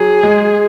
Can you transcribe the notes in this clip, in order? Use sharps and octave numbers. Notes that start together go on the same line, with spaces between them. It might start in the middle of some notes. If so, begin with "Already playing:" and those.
Already playing: F#3 G#4
G#3